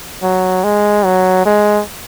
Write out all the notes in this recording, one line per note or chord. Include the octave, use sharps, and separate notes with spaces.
F#3
G#3
F#3
G#3